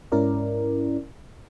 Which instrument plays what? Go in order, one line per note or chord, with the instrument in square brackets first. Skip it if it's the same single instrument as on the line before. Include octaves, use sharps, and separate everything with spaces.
[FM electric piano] G#2 C#4 E4 A#4 D5